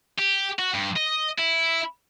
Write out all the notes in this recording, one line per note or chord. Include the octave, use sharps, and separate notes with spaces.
G4
F#4
G2
D#5
E4